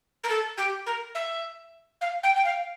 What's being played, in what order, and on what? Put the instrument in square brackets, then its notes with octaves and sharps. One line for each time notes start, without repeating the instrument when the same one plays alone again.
[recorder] A#4
A4
G4
A#4
E5
F5
G5
G5
F5